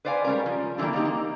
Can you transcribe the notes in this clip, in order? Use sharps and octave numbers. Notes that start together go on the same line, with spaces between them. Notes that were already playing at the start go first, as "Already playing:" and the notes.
B4 C5 D5 F5 F#5 G#5
G3 G#3 C#4 A#4
F3
D3 E3 F#3 G3 A#3
A#3 C4 D#4 G4
A#3